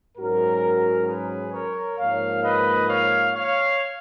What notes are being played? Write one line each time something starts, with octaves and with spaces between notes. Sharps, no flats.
G#2 F#3 C#4 F#4 A#4
G#4 B4
A#4 C#5
G#2 F3 A#3 C#5 F5
B4 D#5
C#5 F5
C#5 F5